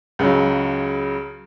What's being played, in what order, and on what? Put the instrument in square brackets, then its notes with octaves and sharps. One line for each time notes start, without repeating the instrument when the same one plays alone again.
[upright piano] C#2 C#3 F#3